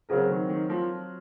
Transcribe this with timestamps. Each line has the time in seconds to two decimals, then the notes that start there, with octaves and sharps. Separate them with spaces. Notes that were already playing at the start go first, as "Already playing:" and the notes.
0.09 C#3 F#3 C4 F#4 A#4
0.30 D#3
0.49 D#3
0.70 F3